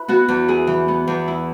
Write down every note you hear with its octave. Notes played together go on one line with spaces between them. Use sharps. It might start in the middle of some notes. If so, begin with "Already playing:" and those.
Already playing: E4 B4
B3 F#4
E2
E4 G#4
E3
B3
E2
E4